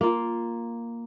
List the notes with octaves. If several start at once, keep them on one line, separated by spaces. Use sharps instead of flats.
A#3 F4